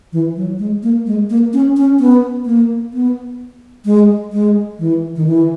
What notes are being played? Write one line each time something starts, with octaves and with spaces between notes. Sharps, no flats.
E3
F#3
G#3
A#3
G#3
A#3
C#4
C#4
B3
A#3
B3
G#3
G#3
E3
D#3
E3